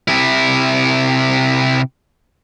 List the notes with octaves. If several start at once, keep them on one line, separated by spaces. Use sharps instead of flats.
C3 E4